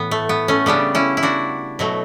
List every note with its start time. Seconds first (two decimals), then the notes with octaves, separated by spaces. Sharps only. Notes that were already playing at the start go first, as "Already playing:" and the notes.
Already playing: A2 E3 B3
0.11 A3
0.29 B3
0.48 A3 C#4
0.66 C#3 G3 B3 D4
0.95 C#4 E4
1.17 E4
1.23 D4 F#4
1.79 B2 F#3 A3